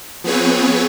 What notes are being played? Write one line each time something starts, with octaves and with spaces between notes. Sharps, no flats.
F3 B3 C4 G#4 B4 C#5